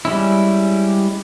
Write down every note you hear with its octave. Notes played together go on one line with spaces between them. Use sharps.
G3 G#3 C#4 E4